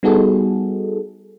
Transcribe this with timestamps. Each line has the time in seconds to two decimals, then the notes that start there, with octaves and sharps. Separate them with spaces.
0.03 G3 B3 D#4 F#4 G#4 A4